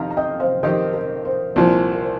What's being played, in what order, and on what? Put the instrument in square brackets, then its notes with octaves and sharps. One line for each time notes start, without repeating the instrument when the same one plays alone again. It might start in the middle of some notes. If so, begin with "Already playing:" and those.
Already playing: [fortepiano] F2 D#3 D#4 G4 [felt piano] F5 A#5
[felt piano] A#5
D#5 G5
C5 F5
[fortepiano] F2 D#3 C4 D#4 G4 [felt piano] A#4 D#5
[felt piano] A#4
C5
[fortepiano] C2 A#2 F3 [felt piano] A#4
[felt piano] A#4
C5